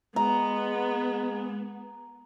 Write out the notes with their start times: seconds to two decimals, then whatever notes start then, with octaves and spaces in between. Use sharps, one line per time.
0.16 G#3 B3 A#5